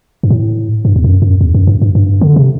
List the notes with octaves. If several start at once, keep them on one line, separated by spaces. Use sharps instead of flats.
G2
A2
G2
E2
F#2
F#2
E2
F#2
G2
G2
G2
D3
C3